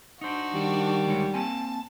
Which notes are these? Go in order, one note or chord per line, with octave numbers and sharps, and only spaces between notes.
D4 D#4 F#4 C5
D#3 G3
D2 G#3 C#5
A#3 C4 G#5 A5